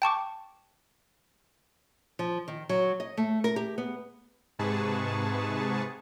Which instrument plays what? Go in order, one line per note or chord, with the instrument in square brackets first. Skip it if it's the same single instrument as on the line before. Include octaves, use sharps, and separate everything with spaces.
[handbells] G5 A5 C#6 D6
[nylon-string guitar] F3
D#3
F#3
D#5
A3
A#4
G4
B3
[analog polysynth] G#2 C3 G#4 B4 A5 C#6